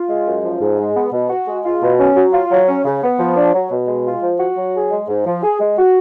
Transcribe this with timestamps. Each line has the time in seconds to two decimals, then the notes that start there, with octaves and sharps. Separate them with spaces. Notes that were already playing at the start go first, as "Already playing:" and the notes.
Already playing: F4
0.09 G#3
0.27 F#2
0.44 F3
0.61 G#2
0.79 G#3
0.96 B3
1.13 B2
1.30 F#4
1.48 G#3
1.65 F4
1.82 B2
1.99 C#4
2.16 F#3
2.33 F4
2.51 F#3
2.68 C#4
2.85 C#3
3.02 B3
3.19 F3
3.37 D4
3.54 F#3
3.71 B2
3.88 G#3
4.06 F4
4.22 F3
4.40 F#4
4.57 F#3
4.75 G#4
4.91 G#3
5.08 G#2
5.26 F3
5.43 G#4
5.60 G#3
5.78 F#4